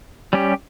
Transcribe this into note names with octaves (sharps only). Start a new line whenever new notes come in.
G3 C#4 G4